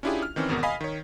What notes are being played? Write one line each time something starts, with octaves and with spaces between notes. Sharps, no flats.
C#4 D4 E4 F4 G4 G#4
F6
D#3 E3 C4 C#4
G#1 E2 B2 F#4 A#4
D#5 F5 G#5 B5 D#6 B6
D#3 C#5